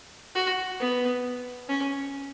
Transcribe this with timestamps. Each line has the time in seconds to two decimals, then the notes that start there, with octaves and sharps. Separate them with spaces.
0.35 F#4
0.80 B3
1.68 C#4